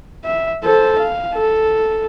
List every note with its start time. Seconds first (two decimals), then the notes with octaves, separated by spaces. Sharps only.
0.25 E5
0.64 A4 C5
0.98 F5
1.34 A4